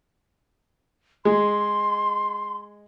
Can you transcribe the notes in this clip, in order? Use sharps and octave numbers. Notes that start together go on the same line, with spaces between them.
G#3 C6